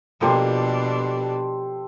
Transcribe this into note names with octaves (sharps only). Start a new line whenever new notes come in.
B2 F3 A#3 D4 G4 A4 C5